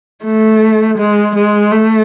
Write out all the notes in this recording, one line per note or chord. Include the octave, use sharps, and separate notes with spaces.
A3
G#3
G#3
A3